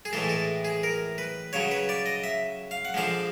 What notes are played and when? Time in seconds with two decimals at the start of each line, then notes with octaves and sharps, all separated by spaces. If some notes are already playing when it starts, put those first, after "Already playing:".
0.05 G#4
0.13 A2 E3 G#3 A4
0.29 A4
0.65 G#4
0.83 A#4
1.18 B4
1.53 C#3 F#3 C#5
1.71 B4
1.89 D5
2.06 D#5
2.24 E5
2.71 F5
2.85 F#5
2.94 D3 F3 G#3 F5